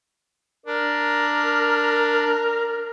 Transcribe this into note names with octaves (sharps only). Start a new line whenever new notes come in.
D4 A#4